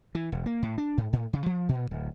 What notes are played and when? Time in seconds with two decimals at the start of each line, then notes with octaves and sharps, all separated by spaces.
0.15 E3
0.32 E1
0.46 A#3
0.63 A2
0.78 D4
0.98 G#2
1.13 A2
1.33 C#3
1.46 F3
1.69 A#2
1.91 D1